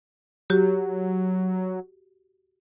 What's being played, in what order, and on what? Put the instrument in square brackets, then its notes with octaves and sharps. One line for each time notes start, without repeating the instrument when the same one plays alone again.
[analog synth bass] F#3 [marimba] F#4 G4